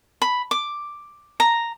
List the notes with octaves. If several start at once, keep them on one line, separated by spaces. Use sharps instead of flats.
B5
D6
A#5